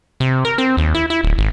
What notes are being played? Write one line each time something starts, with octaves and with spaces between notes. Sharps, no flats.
C3
A#4
C4
D#2
E4
E4
D1
G#1